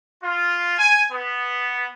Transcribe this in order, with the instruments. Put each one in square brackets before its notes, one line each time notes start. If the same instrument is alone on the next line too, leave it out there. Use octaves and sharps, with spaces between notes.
[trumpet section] F4
G#5
B3